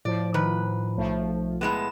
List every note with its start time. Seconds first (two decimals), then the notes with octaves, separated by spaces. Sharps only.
0.05 A2 F3 D5
0.34 D#3 B4
0.97 B1 F3 A3
1.61 A2 G#3 B3 E7